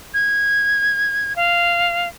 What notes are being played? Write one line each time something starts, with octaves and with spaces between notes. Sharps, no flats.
G#6
F5